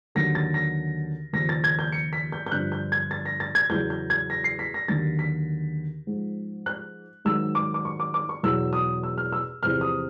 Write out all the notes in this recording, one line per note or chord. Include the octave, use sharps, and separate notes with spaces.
D#2 D3 F#3 A#6
A6
A#6
D#2 C#3 F3 A#6
A6
G#6
G6
C#7
B6
G6
G6
G2 D3 F3 F#6
G6
G#6
A6
A#6
A6
G#6
E2 C#3 F#3 G6
G6
G#6
A#6
C7
B6
A#6
D#2 D3 F#3 A6
B6
G#2 F3
F#6
G#2 D#3 F#3 E6
D6
D6
C#6
D6
D6
C#6
E2 B2 F#3 E6
D#6
E6
F6
E6
E2 C3 F3 F6
D#6